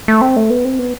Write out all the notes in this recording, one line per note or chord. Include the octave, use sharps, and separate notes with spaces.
A3
C4
A3
B3
C4
B3